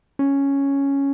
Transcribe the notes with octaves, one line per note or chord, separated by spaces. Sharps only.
C#4